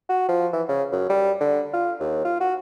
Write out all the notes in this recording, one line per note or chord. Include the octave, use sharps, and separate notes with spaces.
F#4
F3
E3
C#3
F#2
G3
D3
F4
D#2
F4
F#4